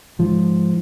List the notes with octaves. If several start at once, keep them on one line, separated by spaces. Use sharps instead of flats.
G#2 F3